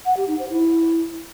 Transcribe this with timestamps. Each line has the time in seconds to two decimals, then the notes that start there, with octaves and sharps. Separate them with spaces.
0.06 F#5
0.17 G4
0.28 D#4
0.39 C5
0.50 E4